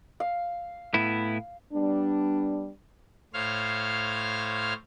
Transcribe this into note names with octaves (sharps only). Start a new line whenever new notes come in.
F5
A2 B3 E4
G3 B3 D4
A2 C5 C#5 F5 F6